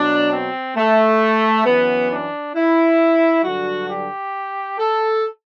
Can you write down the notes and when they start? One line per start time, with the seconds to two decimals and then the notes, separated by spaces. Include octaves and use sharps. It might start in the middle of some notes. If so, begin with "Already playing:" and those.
Already playing: B2 F#3 D4
0.32 C4
0.77 A3
1.66 F#2 E3 B3
2.10 D4
2.55 E4
3.44 G2 D3 F#3 F#4
3.90 G4
4.79 A4